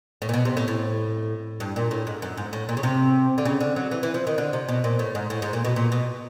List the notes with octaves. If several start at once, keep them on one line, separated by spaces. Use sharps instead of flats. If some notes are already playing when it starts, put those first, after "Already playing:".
A2
A#2
B2
C3
A2
A2
G2
A#2
A2
G#2
F#2
G#2
A2
A#2
C#3
C3
D3
C#3
D3
F#3
E3
E3
F3
D#3
D3
C3
B2
A#2
A2
G#2
A2
G#2
A#2
B2
A#2
B2